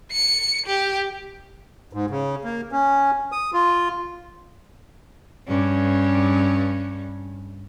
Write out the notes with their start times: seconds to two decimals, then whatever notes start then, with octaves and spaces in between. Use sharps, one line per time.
0.12 C#7
0.66 G4
1.93 G#2
2.10 C#3
2.45 A#3
2.72 C#4
3.32 D#6
3.53 F4
5.48 G2 C#4